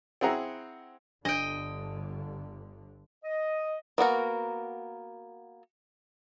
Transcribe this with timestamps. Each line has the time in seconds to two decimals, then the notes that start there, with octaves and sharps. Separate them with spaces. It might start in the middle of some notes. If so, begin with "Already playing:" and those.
0.21 C4 E4 G#4 F#5 A#5
1.25 G1 D3 D4 D#5 G5
3.25 D#5
3.98 A#3 B3 F#4 A#4